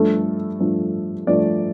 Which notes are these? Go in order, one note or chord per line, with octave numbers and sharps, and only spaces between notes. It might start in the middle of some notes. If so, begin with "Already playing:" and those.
Already playing: G2 F3 A3 A4
G2 F3 A3
G2 F3 A3 D5